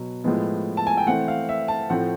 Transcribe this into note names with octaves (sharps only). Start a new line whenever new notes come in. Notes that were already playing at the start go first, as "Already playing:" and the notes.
Already playing: B2 F#3
A2 F3 G#3 B3
A5
G#5
G5
E3 A3 C4 F#5
F5
E5
A5
A2 F3 A3 C4 F#5